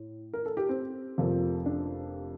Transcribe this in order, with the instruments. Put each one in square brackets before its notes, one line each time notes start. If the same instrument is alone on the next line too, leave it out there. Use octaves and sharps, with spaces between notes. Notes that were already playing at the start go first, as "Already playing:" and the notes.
Already playing: [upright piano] A2
A#4
A4
G4
C4
F1 F2 C3 F3 A#3
D4